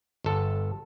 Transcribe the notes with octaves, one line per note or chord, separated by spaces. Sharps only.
G1 A4